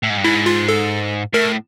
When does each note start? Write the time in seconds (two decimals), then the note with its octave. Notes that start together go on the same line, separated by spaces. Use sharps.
0.03 A2
0.10 G#2
0.17 G2
0.24 G#2 E4
0.46 F4
0.68 A4
1.33 A2 A#4